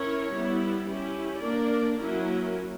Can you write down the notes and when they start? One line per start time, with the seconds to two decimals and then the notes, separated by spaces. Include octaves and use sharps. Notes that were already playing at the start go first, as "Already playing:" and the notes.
Already playing: C#4 E4 A#4 C#5
0.33 G3 B3 E4
0.88 C#4 E4 G4
1.43 A#3 D4 A#4 D5
1.98 F#3 A#3 C#4 E4 A#4